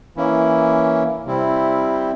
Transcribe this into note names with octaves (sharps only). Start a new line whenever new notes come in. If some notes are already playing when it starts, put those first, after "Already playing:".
E3 A#3 C#4 E4
C3 G3 C4 E4